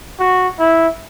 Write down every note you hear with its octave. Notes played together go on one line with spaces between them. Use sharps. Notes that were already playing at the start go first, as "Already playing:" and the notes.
F#4
E4